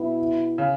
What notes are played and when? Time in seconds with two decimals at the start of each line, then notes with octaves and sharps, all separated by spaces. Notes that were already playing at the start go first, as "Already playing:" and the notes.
Already playing: B2 B3 E4
0.58 C#3